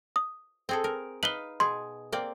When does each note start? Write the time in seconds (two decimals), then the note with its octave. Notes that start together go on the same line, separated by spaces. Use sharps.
0.16 D#6
0.69 C4 G#4 A4
0.84 A#4
1.23 D#4 B4 F5 F#7 G7
1.60 B2 G#4 C6
2.12 A#3 C4 D5